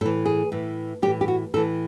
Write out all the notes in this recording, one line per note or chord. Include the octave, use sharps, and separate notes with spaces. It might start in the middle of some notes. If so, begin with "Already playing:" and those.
A2 E3 A4
G#4
A2 E3
A2 E3 G4
G4
F#4
A2 E3 A4